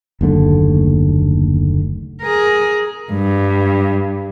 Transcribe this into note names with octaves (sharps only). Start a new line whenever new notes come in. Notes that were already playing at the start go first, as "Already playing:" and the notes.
F#1 D#2 D3 A3
G#4 A#4
G2